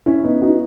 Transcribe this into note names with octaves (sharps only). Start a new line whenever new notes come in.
C#4 E4
B3 D#4
D#4 F#4